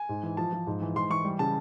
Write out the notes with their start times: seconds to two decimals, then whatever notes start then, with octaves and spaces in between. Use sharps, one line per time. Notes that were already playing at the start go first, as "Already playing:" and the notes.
Already playing: G#5
0.09 G#2
0.23 E3
0.37 F3 A5
0.53 F3
0.67 G#2
0.82 E3
0.95 G#2 C6
1.10 E3 C#6
1.25 G3
1.39 C#3 A5